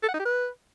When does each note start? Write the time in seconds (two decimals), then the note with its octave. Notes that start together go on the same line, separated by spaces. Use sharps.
0.03 A4
0.08 F#5
0.14 D#4
0.19 G4
0.25 B4